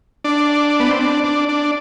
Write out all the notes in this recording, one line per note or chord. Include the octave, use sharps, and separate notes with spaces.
D4
B3
C4
D4
D4
D4